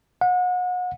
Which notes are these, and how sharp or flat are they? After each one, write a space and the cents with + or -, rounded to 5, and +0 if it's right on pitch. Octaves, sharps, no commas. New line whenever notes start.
F#5 -35